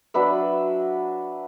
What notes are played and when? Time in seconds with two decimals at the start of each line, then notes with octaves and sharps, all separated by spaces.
0.14 F#3 D4 B4 E5